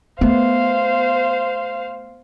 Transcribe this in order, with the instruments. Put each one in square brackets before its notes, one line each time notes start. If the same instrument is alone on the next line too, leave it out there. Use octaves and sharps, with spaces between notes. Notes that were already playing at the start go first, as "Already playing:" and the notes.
[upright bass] A3 [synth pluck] B3 [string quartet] C5 F5